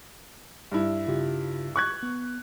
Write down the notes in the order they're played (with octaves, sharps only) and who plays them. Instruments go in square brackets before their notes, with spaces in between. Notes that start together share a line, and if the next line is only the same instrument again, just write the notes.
[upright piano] G2 E4
[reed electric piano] C#3 F4 G4
[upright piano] C#6 F#6 G#6
[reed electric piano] B3